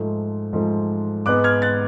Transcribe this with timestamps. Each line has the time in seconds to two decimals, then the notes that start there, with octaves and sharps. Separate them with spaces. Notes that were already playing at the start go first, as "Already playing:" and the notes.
Already playing: G#2 F3 A3
0.53 G#2 F3 A3
1.26 G#2 G#3 B3 D6 F#6
1.44 F6 G#6
1.62 F#6 A6